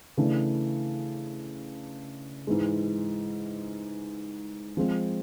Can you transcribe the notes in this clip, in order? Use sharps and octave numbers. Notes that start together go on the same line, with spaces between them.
C#3 E3 A3 D4
G#2 E3 G#3
F3 G#3 C4